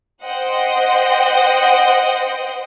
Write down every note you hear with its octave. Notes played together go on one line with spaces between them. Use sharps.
C5 D#5 F#5 G5